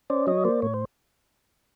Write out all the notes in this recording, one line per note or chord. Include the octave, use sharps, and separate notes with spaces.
C#4 C5 D5
F#3 C#5 D#5
A#3 C5 D5
A2 C#5
C5